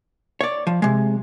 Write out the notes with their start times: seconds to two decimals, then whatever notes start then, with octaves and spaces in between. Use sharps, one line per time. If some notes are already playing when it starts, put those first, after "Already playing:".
0.41 C#5 D5
0.67 F3
0.82 C3 G#3